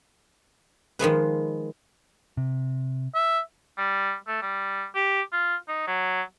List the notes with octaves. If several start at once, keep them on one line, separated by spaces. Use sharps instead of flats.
D#3 F3 G#3 B4
C3
E5
G3
A3
G3
G4
F4
D#4
F#3